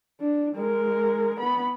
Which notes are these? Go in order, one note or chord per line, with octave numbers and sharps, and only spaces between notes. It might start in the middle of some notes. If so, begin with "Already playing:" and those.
D4
G#3 A#4
B3 B5